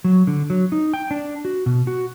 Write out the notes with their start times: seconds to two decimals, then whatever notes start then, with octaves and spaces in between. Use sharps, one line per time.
0.04 F#3
0.27 D3
0.50 F#3
0.72 D#4
0.94 G5
1.11 D4
1.45 F#4
1.66 B2
1.87 F#4